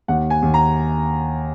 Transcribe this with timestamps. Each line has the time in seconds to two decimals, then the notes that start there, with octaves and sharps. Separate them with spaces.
0.08 D#2 F#5
0.30 G#5
0.42 D#2
0.54 A#5